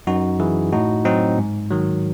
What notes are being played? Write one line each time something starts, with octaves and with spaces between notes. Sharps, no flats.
F#2 D#4 F#4
E3 E4 G#4
A2 D#4 F#4
F#3 C4 D#4
G#2
D#3 F#3